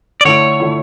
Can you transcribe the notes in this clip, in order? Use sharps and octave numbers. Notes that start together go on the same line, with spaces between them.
D5
D3 A3 E4 C#5
D3 A3 E4